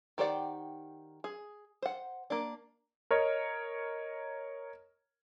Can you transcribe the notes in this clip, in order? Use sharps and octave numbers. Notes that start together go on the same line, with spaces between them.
D#3 G4 C5 D5 F#5
G#4
C5 F#5
A#3 D4
A#4 C#5 D#5